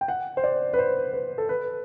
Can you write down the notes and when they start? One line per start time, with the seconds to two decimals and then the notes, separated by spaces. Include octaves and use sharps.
0.01 G5
0.08 F#5
0.37 C5
0.44 D5
0.73 B4
0.79 C5
1.13 B4
1.38 A4
1.49 B4